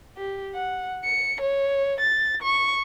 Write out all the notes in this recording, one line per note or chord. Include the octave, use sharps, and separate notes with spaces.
G4
F#5
C#7
C#5
A6
C#6